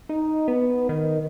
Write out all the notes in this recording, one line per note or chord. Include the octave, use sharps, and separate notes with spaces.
D#4
B3
D#3